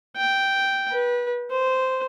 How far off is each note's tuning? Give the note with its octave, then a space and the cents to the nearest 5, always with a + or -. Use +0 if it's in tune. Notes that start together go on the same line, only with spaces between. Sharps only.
G5 -5
B4 -25
C5 -10